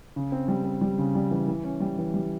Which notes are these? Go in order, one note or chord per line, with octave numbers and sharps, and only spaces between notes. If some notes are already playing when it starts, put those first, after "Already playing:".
C#3
C4
G3
C4
G3
C#3
G3
E3
E3
C#4
G3
E3
G3